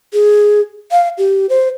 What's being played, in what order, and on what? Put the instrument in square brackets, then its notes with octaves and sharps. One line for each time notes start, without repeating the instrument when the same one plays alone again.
[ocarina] G#4
F5
G4
C5